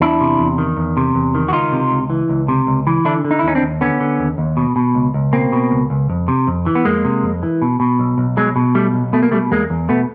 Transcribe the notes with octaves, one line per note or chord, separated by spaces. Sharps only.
E2 D4 E4
C3
E2
D#3
E2
C3
E2
D#3
F#4
C#2 D#4 F4
C3
C#2
E3
C#2
C3
C#2
E3
D3 D4 E4
D3
D#4
E4
D#2 C#4 D#4
C4 D4
D#2
D3 B3 C#4
D3
D#2
D#2
B2
B2
C#2
C#2
B2 A#3 C4
B2
C#2
C#2
F2
C3
F2
E3
B3
F2 G#3 A#3
C3
F2
E3
B2
B2
B1
B1
B2 F#3 G#3
B2
B1 G3 A3
B1
B2 A3
A#3
B2 G3 A3
E2 G#3 A#3
E2
B2 A3 B3